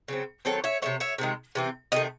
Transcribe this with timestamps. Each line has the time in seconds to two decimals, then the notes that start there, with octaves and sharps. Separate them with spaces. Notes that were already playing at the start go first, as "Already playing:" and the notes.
0.08 C#3 F#3 C4
0.45 D#3 F#3 C4 A4 C#5
0.64 C#5 E5
0.82 C3 F#3 A3 C#5 E5
1.00 C#5 E5
1.18 C3 D#3 G#3
1.55 C3 E3 C4
1.92 C3 D#3 A3 D#5